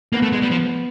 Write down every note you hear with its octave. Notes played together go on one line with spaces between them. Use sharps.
A#3 B3
A3
G#3
G3
F3